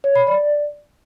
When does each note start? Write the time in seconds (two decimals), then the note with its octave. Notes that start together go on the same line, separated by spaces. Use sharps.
0.04 C#5
0.16 B5
0.27 D5